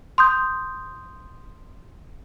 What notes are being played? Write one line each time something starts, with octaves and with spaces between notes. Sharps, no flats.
C6 D#6 G6